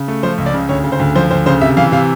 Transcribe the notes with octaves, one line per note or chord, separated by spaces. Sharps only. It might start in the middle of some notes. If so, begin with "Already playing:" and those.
Already playing: C#3
A3
F3 C5
C#2
D5
C#3
D2 C#5
C#3
C5
D2
F3 C5
D2 C5
C#3 C5
C3 E5
E3 F5
C3 F5